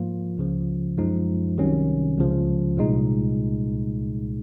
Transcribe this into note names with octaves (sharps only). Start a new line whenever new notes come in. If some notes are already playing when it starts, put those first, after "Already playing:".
Already playing: G#2 F3 A#3 F4
C#2 C#3 F3
F#2 F3 G#3 D#4
C2 C3 D#3 F#3 C#4
C#2 C#3 F3
C2 A#2 G#3 D#4